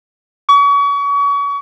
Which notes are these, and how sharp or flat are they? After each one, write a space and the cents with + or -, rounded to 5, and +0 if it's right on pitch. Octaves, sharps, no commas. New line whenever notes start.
C#6 +35